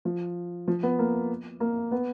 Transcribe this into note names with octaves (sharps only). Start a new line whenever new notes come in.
F3
F3
B3
A#3
A#3
B3